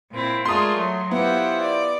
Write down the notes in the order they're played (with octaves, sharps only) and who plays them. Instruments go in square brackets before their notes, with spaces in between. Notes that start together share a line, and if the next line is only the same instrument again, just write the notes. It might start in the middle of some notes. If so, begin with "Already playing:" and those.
[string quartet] A#2 C4 E4
[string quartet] G#3 A3 F4 [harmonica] G#4 A#4 D5 [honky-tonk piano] C6 D#6
[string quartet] F#3 [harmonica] A3
[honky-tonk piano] B3 [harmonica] E4 F4 C5 [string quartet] G4 F#5
[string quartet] D5